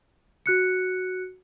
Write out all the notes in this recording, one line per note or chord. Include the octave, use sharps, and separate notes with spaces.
F#4 F#6 C#7